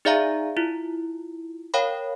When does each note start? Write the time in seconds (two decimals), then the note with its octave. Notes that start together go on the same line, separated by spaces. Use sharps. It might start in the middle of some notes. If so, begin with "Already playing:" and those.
0.05 D#4 G#4 D5 E5 F5 A#5
0.57 E4 F4
1.74 A#4 C#5 F5 G5 B5